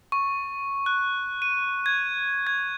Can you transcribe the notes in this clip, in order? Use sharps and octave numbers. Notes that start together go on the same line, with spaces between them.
C#6
F#6
D#7
G#6
G#6